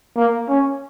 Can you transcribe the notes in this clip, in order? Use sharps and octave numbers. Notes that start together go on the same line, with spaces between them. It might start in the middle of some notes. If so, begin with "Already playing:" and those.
A#3
C#4